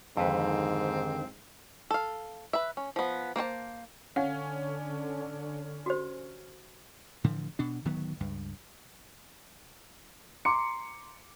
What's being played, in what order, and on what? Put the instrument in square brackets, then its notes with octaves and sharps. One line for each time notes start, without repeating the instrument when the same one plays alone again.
[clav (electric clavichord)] F2 B4 [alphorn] G#2 [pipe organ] D3 D#3 G4 [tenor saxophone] C4
[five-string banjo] A4 F5
B4 E5
C#4
F3 B3
A#3 C5 C#5 A5
[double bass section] D3 [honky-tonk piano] C#4 [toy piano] F5 F#5
[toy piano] F#4 G4 C5
[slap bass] A2 D3 E3 F3
B2 D4
D1 D#3 F#3 B3
C#2 G2
[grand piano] A#5 C6 D6 C#7